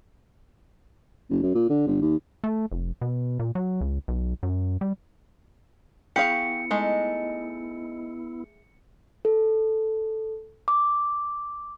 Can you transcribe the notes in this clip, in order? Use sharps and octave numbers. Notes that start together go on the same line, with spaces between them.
F#1
F#2
A#2
D3
G1
D#2
A3
F1
B2
A#2
F#3
C#2
B1
F#2
G3
B3 E4 G4 G#4 F5 F#5 C#6 C#7
G#3 A3 D#4 D#5
A4
D6